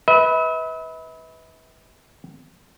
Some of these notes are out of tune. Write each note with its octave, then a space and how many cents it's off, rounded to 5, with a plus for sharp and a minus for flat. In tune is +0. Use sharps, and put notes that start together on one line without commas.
B4 +0 E5 -45